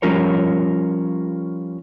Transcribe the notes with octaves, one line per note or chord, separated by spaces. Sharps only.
F3 G3 C#4 F4 A#4 C#5